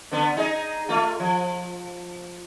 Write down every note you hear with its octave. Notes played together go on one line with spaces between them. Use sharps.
D3 B3
D#4 G#4 D#5
A3 F4
F3